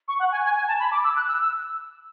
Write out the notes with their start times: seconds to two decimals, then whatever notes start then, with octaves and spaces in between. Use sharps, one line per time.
0.08 C#6
0.19 F#5
0.32 G#5
0.44 G#5
0.56 G#5
0.68 A5
0.80 B5
0.91 D6
1.04 E6
1.16 F#6
1.28 E6
1.41 E6